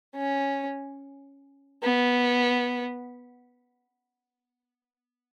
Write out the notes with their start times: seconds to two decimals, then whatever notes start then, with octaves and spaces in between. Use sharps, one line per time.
0.15 C#4
1.83 B3